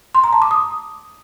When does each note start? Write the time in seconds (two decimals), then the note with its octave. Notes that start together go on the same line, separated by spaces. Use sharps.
0.15 C6
0.24 A#5
0.33 A5
0.42 D6
0.51 D#6